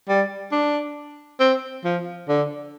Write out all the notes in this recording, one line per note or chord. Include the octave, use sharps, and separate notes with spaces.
G3
D4
C4
F3
D3